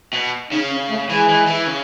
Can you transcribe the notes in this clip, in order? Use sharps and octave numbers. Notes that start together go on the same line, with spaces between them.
B2
C#3 D#4
C#4
A3
E3 G#3
E3
E3
C#3